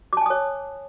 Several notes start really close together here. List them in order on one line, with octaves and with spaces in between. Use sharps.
D6 A5 G#5 D#6 C#5